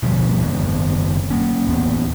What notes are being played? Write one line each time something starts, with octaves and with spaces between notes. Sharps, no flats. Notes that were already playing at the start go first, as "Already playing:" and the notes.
B2 D3 F3 G3
F#1 D#3 G#3 B3
A#3 C#4
D1 E2 B3